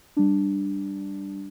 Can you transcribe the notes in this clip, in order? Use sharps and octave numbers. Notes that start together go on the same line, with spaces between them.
G3 D4